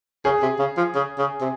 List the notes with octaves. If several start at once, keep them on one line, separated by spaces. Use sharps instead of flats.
C#3 G#4
C3
C#3
F3
C#3
C#3
C3